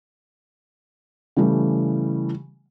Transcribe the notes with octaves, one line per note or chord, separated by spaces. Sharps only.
C#3 E3 G3 A3